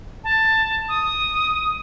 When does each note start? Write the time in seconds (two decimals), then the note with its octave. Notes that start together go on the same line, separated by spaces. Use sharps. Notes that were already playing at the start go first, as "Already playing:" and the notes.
0.24 A5
0.89 D#6